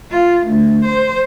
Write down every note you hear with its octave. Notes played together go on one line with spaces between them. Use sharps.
F4
D2
C5